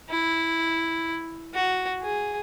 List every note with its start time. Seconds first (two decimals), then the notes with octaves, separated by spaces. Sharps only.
0.10 E4
1.54 F#4
2.02 G#4